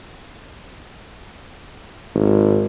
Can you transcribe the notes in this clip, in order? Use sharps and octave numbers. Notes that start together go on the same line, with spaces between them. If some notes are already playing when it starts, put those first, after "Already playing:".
G#1